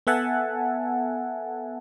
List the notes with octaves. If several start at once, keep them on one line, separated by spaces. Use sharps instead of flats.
B3 A4 E5 F#5 G#5 A5